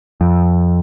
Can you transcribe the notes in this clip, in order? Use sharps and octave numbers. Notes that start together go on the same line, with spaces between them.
F2